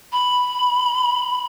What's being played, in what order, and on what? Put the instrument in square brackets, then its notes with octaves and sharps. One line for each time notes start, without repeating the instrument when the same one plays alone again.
[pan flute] B5